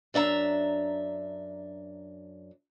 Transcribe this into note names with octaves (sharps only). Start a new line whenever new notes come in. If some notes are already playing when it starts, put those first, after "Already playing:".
F#2 D4 E5 A#5